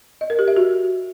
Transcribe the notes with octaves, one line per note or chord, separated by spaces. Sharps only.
D#5
A#4
G4
E5
F#4